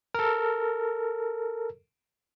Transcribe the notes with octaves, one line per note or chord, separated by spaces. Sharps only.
A4 A#4